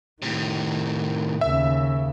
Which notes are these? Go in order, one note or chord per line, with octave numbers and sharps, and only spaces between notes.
A2 C3 D#3
D#2 C#3 E5